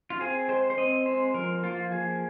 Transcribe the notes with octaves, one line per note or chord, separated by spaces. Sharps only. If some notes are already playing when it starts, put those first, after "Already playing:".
F4
C4 G#4
G#3 C5
C5
C4 D#5
G#3 C5
F3 A#4
A#3 F4
F3 G#4